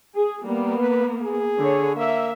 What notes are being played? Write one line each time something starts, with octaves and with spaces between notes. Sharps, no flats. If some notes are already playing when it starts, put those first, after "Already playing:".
G#4
G3 A#3 B3
B4
G#4
D3 C#5
A#3 E5